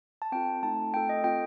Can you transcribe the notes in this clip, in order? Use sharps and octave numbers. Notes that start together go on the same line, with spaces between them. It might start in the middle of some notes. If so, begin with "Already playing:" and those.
A5
C4 F4 A4 G5
A3 C4 D#4 A4 A5
A3 C4 F4 A4 G5
D#5
C4 F4 A4 G5